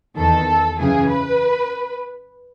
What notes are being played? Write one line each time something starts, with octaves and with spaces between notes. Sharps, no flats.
E2 D#3 A4
F#2 C#3 E3 G#4
B4